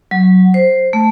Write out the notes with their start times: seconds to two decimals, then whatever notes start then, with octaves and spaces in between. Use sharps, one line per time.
0.11 F#3
0.54 C5
0.93 A3